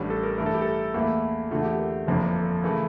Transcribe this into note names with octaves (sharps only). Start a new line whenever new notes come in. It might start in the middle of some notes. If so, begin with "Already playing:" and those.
Already playing: A1 A2 G3 D4
A4
A#4
G2 E3 A3 A#4
A4
G4
A4
E2 E3 A3 A#3 E4
E2 D3 A3 F4
G4
A#4
G1 F2 E3 A#3 D4 A4
A4
A4
C#3 E3 A3 A#4